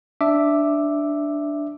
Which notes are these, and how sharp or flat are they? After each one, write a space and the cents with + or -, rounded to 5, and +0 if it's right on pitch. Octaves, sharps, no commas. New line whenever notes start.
D4 +0 E5 +0 D6 +5